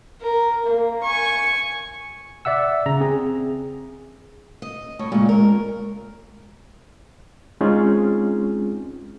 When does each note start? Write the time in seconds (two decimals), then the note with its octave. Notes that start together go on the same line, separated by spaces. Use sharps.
0.21 A#4
0.66 A#3
1.03 G#5 C#6
2.45 D5 E5 F#5 E6
2.86 C#3 A#5
3.01 C4 G#4
4.62 D#5
4.99 A2 C#6
5.12 A#2 C#3 G#3
5.29 A#4
7.61 G#3 C4 C#4 D#4 F4 G#4